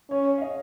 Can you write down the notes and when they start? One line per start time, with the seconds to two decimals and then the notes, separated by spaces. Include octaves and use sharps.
0.10 C#4 C#5
0.38 F5
0.42 D#5